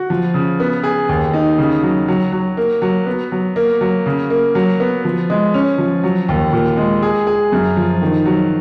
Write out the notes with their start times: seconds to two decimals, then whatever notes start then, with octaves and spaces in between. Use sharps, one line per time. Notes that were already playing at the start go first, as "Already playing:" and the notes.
Already playing: F#4
0.10 F3
0.34 C#3
0.60 B3
0.84 G#4
1.09 D#2
1.33 D#4
1.58 C#3
1.83 F#3
2.08 F#3
2.32 F#3
2.57 A#3
2.82 F#3
3.06 B3
3.32 F#3
3.56 A#3
3.81 F#3
4.06 C#3
4.30 A#3
4.55 F#3
4.80 B3
5.05 F3
5.30 G#3
5.54 C#4
5.78 F3
6.03 F#3
6.28 D#2
6.53 A#2
6.77 G#3
7.02 G#4
7.27 G#4
7.52 F#2
7.77 F3
8.02 D#3
8.26 F#3